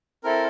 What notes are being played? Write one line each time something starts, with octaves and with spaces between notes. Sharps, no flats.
C4 E4 A4 A#4